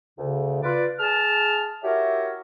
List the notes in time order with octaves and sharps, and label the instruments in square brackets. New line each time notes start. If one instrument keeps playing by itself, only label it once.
[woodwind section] D2 C#3
F4 B4 D5
G#4 A5 F6
E4 F#4 G4 A#4 C#5 E5